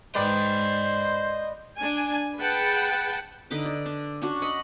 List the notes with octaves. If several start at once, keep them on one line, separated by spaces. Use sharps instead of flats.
G#2 B4 C5 D5 D#5 G5 B5
D4 G#5
G#4 B4 F#5 G5 A5
D3 D#4 B4 D6
D5
D4
C#4 D4 F#4
D#5 F#5 B5